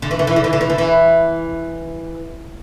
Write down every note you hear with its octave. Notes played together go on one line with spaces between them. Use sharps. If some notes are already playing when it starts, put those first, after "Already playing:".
D3
E3
D3
E3
D3
E3
D3
E3
D3
E3